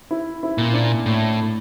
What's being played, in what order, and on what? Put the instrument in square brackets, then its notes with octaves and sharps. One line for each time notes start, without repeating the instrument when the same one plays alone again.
[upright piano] E4
E4
[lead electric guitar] A#2
[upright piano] D4
[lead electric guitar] A2